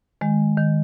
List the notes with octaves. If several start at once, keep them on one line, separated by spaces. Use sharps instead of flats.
D#3 G#3
D#3